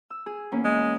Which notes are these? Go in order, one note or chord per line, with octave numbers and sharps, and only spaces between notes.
E6
G#4
E2 A#3 C#4
G#3